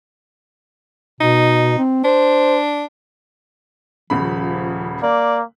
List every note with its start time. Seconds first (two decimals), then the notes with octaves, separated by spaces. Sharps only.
1.21 B2 D#4
1.78 C4
2.04 D4 C5
4.10 D#1 C#3 F3 B5
5.03 A#3 D5